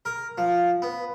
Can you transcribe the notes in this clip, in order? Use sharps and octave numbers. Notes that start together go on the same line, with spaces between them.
A#4
F3
B3